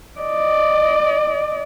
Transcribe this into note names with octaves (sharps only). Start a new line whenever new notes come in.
D5 D#5